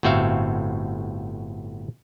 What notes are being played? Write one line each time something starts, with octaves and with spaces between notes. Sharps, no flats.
G1 A2 C4 F#4 E5 F5